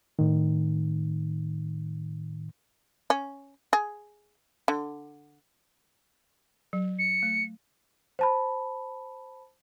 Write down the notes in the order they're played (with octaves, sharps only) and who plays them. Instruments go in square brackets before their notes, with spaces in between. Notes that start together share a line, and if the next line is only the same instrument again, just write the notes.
[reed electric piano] A2 D#3
[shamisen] C#4
G#4
D3
[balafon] F#3
[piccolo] C#7
[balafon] A3
[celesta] C5 A5 B5